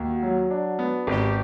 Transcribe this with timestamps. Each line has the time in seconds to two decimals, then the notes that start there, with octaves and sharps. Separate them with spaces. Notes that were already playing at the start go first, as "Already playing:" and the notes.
Already playing: D#2 F#4
0.23 F#3
0.51 D4
0.79 B3
1.07 G#1 G4